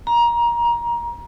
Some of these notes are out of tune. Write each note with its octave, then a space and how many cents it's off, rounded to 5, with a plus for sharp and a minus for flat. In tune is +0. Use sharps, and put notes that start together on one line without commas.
A#5 +20
A#5 +20